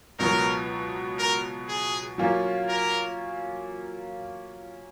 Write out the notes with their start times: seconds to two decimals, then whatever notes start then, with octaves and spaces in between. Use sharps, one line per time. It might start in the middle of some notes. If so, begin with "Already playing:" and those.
0.19 C#2 B2 F#3 B3 A#4
1.19 A#4
1.68 G#4
2.18 F#3 A#3 C#4 F4
2.68 A#4